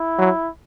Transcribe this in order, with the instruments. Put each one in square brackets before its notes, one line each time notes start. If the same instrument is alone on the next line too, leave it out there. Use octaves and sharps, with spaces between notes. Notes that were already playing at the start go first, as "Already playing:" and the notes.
Already playing: [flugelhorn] E4
[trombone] F#3